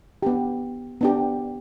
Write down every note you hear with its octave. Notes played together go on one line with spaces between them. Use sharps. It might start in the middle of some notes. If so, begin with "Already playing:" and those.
B3 D4 G4
B3 D4 G4